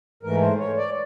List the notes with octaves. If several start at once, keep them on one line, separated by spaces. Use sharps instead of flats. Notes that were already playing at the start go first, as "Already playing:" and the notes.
G#2 E3 A3 A#4
C5
C#5
D5